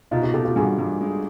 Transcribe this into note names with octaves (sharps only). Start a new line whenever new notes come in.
B2 D#4 F4
F4 G4
B2 G4 A4
F4 G4
G2 F#4 G#4
G2
G#3